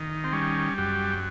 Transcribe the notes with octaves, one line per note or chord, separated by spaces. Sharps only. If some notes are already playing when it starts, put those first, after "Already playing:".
Already playing: D#3
C4
G3 C#4
F#2 G4